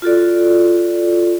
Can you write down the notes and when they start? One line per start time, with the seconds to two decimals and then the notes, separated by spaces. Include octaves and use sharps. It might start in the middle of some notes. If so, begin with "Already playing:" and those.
0.02 F4 F#4 A4 D5